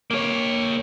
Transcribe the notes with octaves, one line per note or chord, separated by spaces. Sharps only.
A#3 C#5